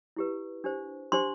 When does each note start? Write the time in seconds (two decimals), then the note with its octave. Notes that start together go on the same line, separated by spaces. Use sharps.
0.16 E4 G4 B4
0.64 D4 G4 C5
1.12 D4 G4 C5 C6